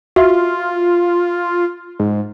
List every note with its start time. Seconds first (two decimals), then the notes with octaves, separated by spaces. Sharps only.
0.16 F4 F#4 E5
2.00 G#2